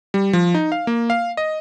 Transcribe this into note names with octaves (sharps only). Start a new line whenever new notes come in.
G3
F3
D#4
F5
A#3
F5
D#5